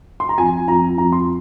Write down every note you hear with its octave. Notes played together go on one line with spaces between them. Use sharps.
C6
A#5
F2 G#5
F2 A#5
F2 A#5
C6